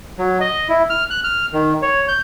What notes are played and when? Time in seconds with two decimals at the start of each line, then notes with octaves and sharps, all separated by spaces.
0.18 F#3
0.40 D#5
0.69 E4
0.90 F6
1.11 F#6
1.24 F6
1.53 D#3
1.82 C#5
2.08 G6